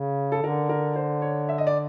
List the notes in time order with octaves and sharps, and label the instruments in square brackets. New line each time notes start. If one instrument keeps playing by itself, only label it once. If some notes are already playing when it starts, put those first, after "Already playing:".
Already playing: [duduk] C#3
[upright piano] A4
[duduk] D3 [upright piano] A#4
[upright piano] A#4
C5
C#5
E5
D#5
D5